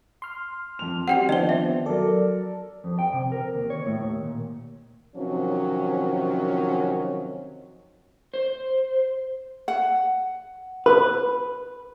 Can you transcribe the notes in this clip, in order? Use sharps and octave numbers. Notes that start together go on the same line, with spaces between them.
C6 F6
F2 F7
G3 C4 F#4 F#5 G5 F7
D#3 F3 B3 D4 C5 D#5 G7
E5
F#3 A4 A#4 D5
F2
G5
C3
A#4
D#2
C#5
A2
D#2
A#2
C3 D#3 F3 F#3 C4 C#4
C5
F#5
B4